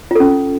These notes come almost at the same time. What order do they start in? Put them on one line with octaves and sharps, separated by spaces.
F4 A4 C#4